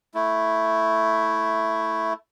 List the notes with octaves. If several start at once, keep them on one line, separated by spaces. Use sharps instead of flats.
A3 E4